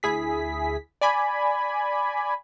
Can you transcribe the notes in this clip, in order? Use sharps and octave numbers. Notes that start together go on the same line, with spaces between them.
D2 E4 G#4 B6
D5 G#5 B5